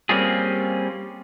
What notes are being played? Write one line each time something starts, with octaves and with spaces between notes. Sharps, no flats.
G3 A#3 C4 C#4 F4 G#4